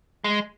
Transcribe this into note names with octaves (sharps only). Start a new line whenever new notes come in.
G#3